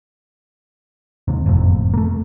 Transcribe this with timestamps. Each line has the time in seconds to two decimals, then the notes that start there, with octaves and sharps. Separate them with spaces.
1.28 D#2 G#2 C3
1.46 F#1 F2 A2 C3
1.94 A3 A#3